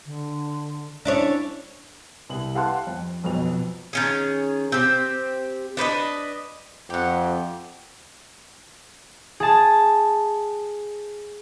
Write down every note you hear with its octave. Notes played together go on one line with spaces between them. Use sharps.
D3
C#4 D4 E4 C#5
C2 F#7
G4 F5 F#5 A5 C6 F#6
F2
B1 F2 B2 F7
D#3 C#4 G#4
C4 G4
D4 B4 C5 D#5
F2 G4 F#5
G#4 A5